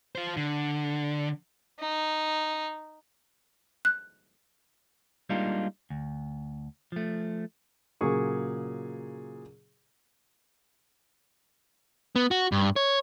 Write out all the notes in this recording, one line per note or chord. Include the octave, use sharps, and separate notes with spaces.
F4 C5
D3
D#4
F#6
G3 G#3 A#3 D4 D#4 F4
D2
F3 A3
A#2 C#3 F#3 G#4 C#6
B3
F#4
G2
C#5